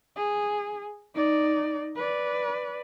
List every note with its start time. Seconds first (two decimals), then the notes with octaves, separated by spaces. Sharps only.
0.16 G#4
1.15 D#4 D5
1.96 B4 D5